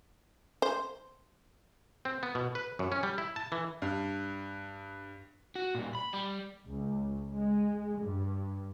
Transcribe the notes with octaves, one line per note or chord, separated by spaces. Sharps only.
C5
C4
B3
B2
B4
F#2
C#4
G3
E4
A5
E3
G2
F#4
A#2 G3
B5
G3
C#2
G#3
G2